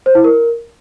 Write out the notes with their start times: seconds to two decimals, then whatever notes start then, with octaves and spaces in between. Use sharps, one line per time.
0.06 C5
0.15 E4
0.24 A#4